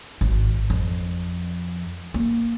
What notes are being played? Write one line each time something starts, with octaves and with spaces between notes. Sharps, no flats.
G#1
F2
A#3